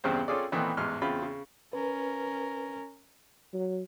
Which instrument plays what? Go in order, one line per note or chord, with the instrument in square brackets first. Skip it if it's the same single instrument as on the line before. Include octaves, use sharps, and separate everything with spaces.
[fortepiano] E2 G2 C#3 C4 C5
C4 C#4 F4 G#4 A4 D5
A#2 D#3 E3 A3 B3 C4
A1 E2 G#2 G#3 F6
E2 C#3 C4 F4 B5
C#3
[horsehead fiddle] C#4 A#4 [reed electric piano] B4
[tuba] F#3